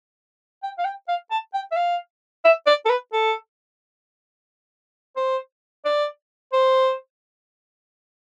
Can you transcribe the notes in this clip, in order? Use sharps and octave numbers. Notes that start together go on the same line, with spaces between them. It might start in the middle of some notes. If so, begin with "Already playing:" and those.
G5
F5
G5
F5
A5
G5
E5
F5
E5
D5
A4
B4
A4
C5
D5
C5